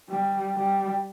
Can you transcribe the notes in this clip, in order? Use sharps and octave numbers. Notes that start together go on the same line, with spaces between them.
G3
G3